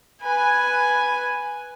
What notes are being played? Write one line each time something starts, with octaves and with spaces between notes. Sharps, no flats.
B4 G#5